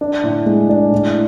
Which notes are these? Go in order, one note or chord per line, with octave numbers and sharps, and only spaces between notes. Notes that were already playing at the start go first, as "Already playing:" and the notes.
D4
A2
G#3
D4
A2